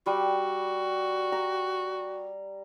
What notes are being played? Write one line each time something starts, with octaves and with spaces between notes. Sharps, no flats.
G3 F#4
A#5